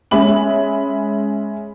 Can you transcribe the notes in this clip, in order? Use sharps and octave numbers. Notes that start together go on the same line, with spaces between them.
G#3 C#4 E5 B5 F#7